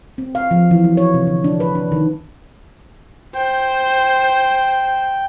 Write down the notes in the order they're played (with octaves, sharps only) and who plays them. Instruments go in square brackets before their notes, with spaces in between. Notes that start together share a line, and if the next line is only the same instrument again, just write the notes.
[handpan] C4
F5
F3
E3
F#3
C#5
C3
D3
D4
B4
D4
D#3
[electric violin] C5 [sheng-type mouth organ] G5